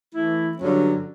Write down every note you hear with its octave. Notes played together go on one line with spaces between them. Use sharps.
E3 A3 E4
G2 D3 F#3 C#4